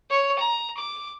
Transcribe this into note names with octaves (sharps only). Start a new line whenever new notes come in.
C#5
A#5
D6